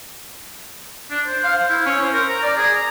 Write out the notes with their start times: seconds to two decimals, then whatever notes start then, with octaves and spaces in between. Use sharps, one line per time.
1.11 D4
1.27 C5
1.43 F5
1.55 C5
1.69 E4
1.86 C#4
2.01 C5
2.13 A#4
2.29 A#5
2.43 D5
2.57 G#4
2.74 A#5